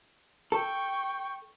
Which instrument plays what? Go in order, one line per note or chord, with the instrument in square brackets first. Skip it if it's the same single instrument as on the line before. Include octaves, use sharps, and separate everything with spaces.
[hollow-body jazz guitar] A4 [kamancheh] G5 C#6